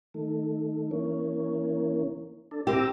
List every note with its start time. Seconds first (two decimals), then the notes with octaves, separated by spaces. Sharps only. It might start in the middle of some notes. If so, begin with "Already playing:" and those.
0.14 D#3 A3
0.91 E3 A#3 C#4
2.51 D4 A4
2.67 C4 G4 A#5 E6